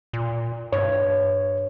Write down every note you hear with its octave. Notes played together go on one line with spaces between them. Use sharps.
A#2
G2 C#5